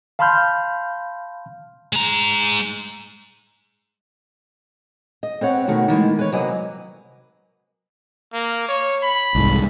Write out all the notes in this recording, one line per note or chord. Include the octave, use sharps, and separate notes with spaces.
F5 A5 B5 C6 F6 G6
G#3 A#5
D#5
C4 B4 C#5 F#5
B2 D#3 A3 F#4
D#3 E3 G#3 A3
B4 C#5
C3 F#3 A#3 B4 D#5 G#5
A#3
C#5
B5
C2 G#2